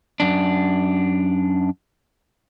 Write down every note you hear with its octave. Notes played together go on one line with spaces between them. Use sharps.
F#2 D4